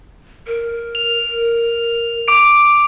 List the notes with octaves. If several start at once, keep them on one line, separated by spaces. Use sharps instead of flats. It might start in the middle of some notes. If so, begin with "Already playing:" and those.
A#4
F7
D6 D7